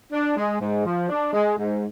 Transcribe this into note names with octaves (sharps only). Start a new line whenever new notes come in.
D4
G#3
G#2
F3
D4
G#3
G#2